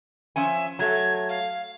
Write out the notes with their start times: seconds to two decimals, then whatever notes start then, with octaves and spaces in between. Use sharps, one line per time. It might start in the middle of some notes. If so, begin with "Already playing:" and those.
0.36 F3 C#4 E5 G#5
0.79 F#3 A3 G#6
1.28 F5